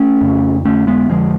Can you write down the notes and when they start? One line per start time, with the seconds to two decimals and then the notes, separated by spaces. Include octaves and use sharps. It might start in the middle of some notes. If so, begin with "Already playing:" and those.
Already playing: A3 C#4
0.21 F2 C#3
0.65 F2 D3 A3 C#4
0.87 G#3 B3
1.09 F2 D3 F3 G#3